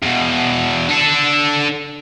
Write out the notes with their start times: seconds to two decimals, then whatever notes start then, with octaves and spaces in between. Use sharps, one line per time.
0.03 E2 B2
0.89 D4 A4